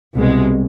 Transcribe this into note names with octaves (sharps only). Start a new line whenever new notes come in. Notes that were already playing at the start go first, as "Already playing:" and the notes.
C2 B2 G#3